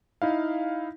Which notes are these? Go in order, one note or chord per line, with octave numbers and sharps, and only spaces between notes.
D#4 E4 F5